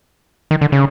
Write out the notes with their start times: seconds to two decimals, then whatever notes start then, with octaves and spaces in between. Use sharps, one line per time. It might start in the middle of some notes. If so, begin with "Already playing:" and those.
0.51 D#3
0.61 D3
0.72 C#3